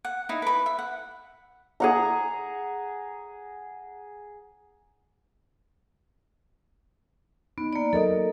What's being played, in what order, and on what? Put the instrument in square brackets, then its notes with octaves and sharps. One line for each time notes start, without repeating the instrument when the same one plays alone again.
[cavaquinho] F#5
D#4 E4
B4 B5
E5
F#5
[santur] G#4 F#5 A#5
[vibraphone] B3 [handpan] D#4
[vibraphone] A#3 D5
[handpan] F#3 A#4 D#5 [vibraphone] A4